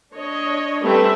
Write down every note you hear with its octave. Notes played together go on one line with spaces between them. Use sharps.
D4 C#5 D#5
G3 A3 C4 C#4 B4 E5